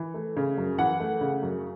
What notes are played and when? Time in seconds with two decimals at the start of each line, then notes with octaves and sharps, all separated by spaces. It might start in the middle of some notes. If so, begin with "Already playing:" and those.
Already playing: E3
0.14 A3
0.37 C#3
0.57 F#2
0.78 E3 F#5
1.00 A3
1.21 C#3
1.42 F#2